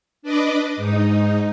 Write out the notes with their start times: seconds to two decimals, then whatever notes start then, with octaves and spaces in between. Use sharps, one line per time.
0.22 D4 B4 D5 D#5
0.76 G#2 D#4